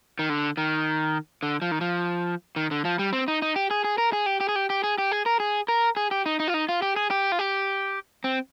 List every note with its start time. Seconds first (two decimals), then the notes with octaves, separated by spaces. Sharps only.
0.19 D#3
0.30 D3
0.57 D#3
1.43 D3
1.62 F3
1.72 D#3
1.81 F3
2.56 D#3
2.71 D3
2.85 F3
2.99 G3
3.13 C4
3.28 D#4
3.42 D#4
3.56 G4
3.71 G#4
3.84 G#4
3.98 A#4
4.13 G#4
4.26 G4
4.40 G4
4.49 G#4
4.56 G4
4.70 G4
4.84 G#4
4.98 G4
5.12 G#4
5.26 A#4
5.40 G#4
5.68 A#4
5.96 G#4
6.11 G4
6.26 D#4
6.40 D#4
6.48 F4
6.54 D#4
6.69 F4
6.82 G4
6.96 G#4
7.10 G4
7.32 F4
7.39 G4
8.24 C4